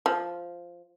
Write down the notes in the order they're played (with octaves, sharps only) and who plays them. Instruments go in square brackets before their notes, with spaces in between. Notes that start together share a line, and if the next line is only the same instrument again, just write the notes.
[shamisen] F3